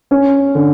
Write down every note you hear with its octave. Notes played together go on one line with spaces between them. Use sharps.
C#4
D3